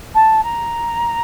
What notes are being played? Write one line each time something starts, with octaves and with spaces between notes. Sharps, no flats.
A5
A#5